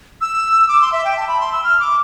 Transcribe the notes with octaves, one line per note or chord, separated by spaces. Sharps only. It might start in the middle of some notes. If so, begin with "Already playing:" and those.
E6
D6
C6
E5
G5
A5
B5
C6
E6
F6
D6